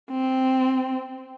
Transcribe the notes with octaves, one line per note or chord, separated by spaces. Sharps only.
C4